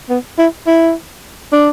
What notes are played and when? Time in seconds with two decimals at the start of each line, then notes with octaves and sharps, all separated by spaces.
0.09 B3
0.38 E4
0.67 E4
1.52 D4